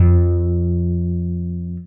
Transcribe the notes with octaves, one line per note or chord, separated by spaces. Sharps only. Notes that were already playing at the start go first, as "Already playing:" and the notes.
Already playing: F2